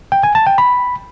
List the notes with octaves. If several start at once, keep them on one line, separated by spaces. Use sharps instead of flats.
G5
G#5
A5
G5
B5